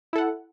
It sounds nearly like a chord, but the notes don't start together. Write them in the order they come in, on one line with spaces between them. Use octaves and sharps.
E4 A4 F#5